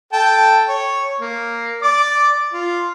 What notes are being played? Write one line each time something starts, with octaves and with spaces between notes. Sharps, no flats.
A4 G5 A5
C#5
A#3
D5 D6
F4